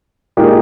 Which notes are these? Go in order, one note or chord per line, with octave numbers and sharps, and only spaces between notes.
A#2 G#3 D#4 G4 A#4